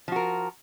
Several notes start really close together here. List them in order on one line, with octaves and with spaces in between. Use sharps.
F3 F#4 A#4